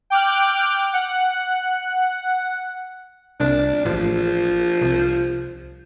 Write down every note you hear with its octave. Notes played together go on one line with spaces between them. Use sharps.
G5 D6 F6 F#6
F#5
C2 D4
A1 F3
C2